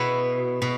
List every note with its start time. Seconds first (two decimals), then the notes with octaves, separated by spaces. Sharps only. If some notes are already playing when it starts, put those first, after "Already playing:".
Already playing: B2 B3 E4
0.62 B2